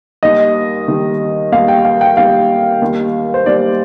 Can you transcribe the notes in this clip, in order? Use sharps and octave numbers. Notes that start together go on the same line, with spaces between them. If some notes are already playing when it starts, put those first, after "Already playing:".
D#2 D#3 G3 D#5
D#2 D#3 G3
D#2 D#3 G3 F5
G5
F5
G5
D#2 D#3 G3 F5
D#2 D#3 G3
C5
D#2 D#3 G3 D5